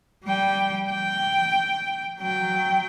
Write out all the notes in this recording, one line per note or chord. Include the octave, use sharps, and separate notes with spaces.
G3 G5
G5
F#3 G5